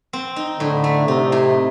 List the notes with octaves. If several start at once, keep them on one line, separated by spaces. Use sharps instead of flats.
C4
D#4
A2 D3
A3
C3 D#4
A2